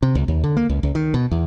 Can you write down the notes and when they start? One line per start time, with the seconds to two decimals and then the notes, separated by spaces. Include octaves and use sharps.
0.02 C3
0.15 C#2
0.28 D#2
0.44 D3
0.57 A#3
0.69 C#2
0.83 C#2
0.95 D#3
1.14 B2
1.31 E2